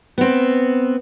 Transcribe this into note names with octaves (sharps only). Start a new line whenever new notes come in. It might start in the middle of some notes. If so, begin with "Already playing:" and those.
B3 C4